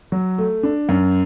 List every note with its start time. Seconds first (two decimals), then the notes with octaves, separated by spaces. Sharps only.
0.12 F#3
0.38 A3
0.63 D4
0.89 F#2